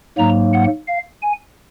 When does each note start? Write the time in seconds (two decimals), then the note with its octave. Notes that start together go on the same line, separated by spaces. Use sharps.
0.18 G#2 F#3 A#3 A#5
0.53 F#5
0.88 F5
1.23 G#5